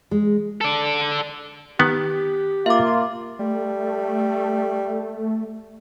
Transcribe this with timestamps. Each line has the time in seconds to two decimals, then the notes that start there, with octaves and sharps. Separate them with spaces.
0.11 G#3
0.61 A4 D5
1.79 D#3 B3 G4
2.66 A#3 F4 E5 D6
3.39 G3 A3